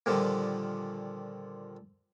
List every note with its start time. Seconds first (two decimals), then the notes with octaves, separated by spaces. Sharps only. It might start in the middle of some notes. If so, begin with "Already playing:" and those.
0.06 A#2 D3 D#3 F3 G3